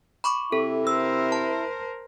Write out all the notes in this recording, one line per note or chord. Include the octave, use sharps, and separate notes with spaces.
B5 C#6 D6
C3 E4 A4
A#4 C5 E6
A5